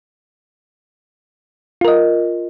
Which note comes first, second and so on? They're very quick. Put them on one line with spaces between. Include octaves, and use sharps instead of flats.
F4 A#4 D#5